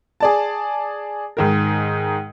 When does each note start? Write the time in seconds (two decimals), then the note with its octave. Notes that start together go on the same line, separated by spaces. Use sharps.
0.20 G#4 D5 A5
1.37 G#2 D#3 A#4